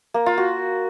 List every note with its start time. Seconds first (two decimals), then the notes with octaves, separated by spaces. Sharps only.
0.14 A#3
0.26 F4
0.38 F#4